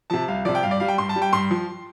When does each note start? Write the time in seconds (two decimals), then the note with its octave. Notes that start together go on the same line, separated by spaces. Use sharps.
0.10 C3 F3 A5
0.28 C2 F5
0.45 C3 F3 D5
0.55 G5
0.63 G2 F5
0.71 D5
0.80 G3 F5
0.88 G5
0.98 G2 C6
1.09 A5
1.16 G3
1.22 G5
1.33 G2 C6
1.51 F3